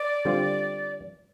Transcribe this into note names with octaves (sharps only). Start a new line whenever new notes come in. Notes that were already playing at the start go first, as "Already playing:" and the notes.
Already playing: D5
D3 G3 C4 F4